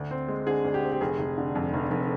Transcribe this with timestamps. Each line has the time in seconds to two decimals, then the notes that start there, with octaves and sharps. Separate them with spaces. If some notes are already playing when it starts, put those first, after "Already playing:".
Already playing: D2
0.11 C4
0.28 G#3
0.47 D3 G#4
0.65 D2
0.74 G4
0.83 C4
0.92 G4
1.01 F1 G#4
1.19 F1
1.38 D3
1.55 F2
1.73 F1
1.91 F1